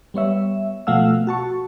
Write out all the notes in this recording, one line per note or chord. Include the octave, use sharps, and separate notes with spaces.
G3 B3 C#5 E5
B2 F3 A3 F5 F#5 E6
F#4 A5 C#6